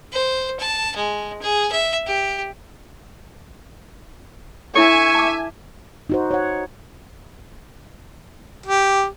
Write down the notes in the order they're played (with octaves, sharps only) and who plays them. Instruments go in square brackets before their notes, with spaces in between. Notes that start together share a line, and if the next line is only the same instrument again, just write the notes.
[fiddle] C5
A5
G#3
G#4
E5
G4
[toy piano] D4 E4 A4 [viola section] E5 G#5 [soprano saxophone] C#6
[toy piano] A5 D6
[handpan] D#4 F#4 C5
C#5 F#5
[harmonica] G4